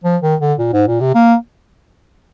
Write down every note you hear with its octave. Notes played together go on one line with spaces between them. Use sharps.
F3
D#3
D3
A#2
G#2
A#2
C3
A#3